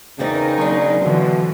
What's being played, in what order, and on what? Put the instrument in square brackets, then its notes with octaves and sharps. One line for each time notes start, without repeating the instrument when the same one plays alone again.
[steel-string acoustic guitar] E2 E3 C4 [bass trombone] C#3 [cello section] D#4 A#4 [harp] G5 A6
[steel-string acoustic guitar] D#2 D4 [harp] F#3 C4 C#5
[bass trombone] B2 [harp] D3 C5 [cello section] E3 F3